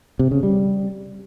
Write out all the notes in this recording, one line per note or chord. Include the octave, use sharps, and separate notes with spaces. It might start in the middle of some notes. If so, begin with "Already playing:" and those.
C3
C#3
G3